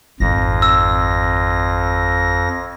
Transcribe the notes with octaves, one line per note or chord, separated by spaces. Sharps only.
G#1 F2 D#3 A#6
E6